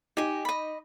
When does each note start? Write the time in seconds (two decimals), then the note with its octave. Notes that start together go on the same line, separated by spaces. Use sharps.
0.17 D#4 G4 G#5
0.45 D#5 B5